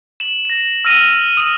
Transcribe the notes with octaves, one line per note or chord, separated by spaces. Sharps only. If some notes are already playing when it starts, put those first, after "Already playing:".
E7 F#7
A#6 E7
E6 F6 A#6 D#7 F7 F#7
D#6 D#7